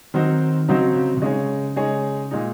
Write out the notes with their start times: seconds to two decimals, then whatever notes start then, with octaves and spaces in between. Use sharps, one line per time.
0.14 D#3 F#3 C4 D#4 F#4 C5
0.68 C#3 F#3 C4 D#4 F#4 C5
0.95 C#3
1.17 C3
1.22 C#3 G#3 D#4 G#4 C#5
1.76 G#3 D#4 G#4 C#5
2.31 A#2 G#3 D#4